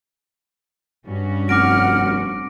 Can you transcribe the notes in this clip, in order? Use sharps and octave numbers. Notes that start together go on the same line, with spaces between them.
G2 C#4 F#4
F1 F#5 D6 F6 A#6 D7